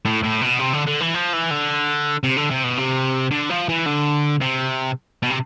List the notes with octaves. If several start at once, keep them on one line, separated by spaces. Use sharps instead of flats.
A2
A2
B2
C3
D3
D3
E3
F3
E3
D3
C3
D3
C3
B2
C3
D3
F3
E3
D3
C3
B2
C3